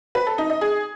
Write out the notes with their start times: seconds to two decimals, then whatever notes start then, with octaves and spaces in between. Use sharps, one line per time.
0.15 B4
0.27 A4
0.38 D#4
0.50 D#5
0.61 G#4